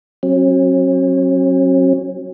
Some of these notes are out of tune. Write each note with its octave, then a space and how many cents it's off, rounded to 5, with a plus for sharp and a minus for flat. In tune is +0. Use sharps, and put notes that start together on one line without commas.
F#3 +0 C#4 -45